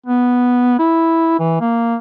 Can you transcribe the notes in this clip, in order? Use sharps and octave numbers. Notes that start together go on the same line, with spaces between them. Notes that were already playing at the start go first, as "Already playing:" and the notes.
B3
E4
E3
A#3